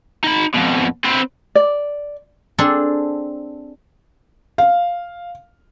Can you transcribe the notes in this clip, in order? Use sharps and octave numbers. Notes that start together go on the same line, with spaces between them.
D#4 B5
F2 B2
C4 B4
D5
C4 D4 G#4 A4
F5